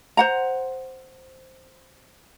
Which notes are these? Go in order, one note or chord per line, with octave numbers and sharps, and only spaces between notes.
C5 F#5 A#5